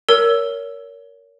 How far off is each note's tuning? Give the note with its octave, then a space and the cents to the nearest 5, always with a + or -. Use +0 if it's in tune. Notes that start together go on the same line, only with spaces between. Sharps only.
A#4 +0 C#5 +25 E6 +5